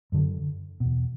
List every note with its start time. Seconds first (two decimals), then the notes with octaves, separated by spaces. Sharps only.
0.12 F#2 D3
0.80 E2 B2